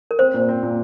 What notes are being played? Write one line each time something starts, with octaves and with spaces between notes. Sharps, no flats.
A#4
C4 C5
A#2
C4
A#2